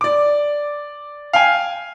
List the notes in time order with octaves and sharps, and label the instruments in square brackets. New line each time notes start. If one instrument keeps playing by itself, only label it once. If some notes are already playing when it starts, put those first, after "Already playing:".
[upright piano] D5 D6
[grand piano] F5 G5 G#5